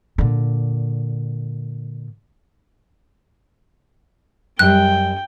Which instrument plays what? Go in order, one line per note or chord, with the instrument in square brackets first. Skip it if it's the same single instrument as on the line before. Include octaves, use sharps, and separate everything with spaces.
[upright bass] A#2 D3
[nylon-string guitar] F#2 G3 [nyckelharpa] G5 [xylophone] F#6